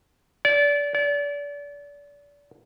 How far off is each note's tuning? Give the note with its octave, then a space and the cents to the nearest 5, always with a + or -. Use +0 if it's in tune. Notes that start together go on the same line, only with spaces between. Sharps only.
D5 -25
D5 -30